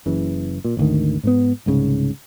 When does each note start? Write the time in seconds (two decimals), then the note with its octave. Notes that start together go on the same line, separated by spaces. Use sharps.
0.06 F#1 C#3 E3
0.65 A#2
0.77 G#1 D2 D#3
1.23 G#2 A#3 B3
1.66 C2 G#2 C#3